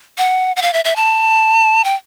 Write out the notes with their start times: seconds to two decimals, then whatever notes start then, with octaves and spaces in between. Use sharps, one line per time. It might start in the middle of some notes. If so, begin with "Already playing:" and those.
0.18 F#5
0.56 F#5
0.62 F5
0.73 E5
0.84 E5
0.96 A5
1.84 G5